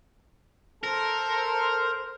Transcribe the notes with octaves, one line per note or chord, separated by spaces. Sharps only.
A4 A#4 C5